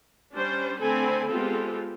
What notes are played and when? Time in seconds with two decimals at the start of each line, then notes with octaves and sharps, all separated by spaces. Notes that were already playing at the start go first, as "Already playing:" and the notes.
0.35 G3 C#4 D4 C5
0.81 D3 A3 C4 A4 G#5 B5
1.29 G#3 B3 C4 F4 G4 A4